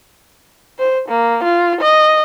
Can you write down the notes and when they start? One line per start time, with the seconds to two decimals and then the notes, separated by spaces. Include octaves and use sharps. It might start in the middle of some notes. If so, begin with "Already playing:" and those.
0.79 C5
1.09 A#3
1.44 F4
1.81 D#5